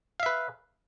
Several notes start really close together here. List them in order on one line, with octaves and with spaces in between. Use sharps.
F5 E5 B4